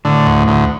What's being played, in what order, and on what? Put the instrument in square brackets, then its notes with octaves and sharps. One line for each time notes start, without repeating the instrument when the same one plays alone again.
[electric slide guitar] A2 [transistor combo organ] D3
[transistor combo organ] D2
D2